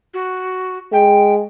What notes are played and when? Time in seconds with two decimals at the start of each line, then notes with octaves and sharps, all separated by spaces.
0.13 F#4
0.92 G#3 G5